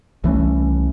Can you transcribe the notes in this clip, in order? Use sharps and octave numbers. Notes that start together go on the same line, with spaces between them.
C2 E3 A3 C#4